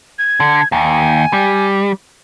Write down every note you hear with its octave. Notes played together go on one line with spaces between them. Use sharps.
G#6
D3
D#2 G#5
G3